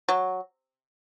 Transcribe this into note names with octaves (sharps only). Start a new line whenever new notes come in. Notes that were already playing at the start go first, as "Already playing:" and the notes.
F#3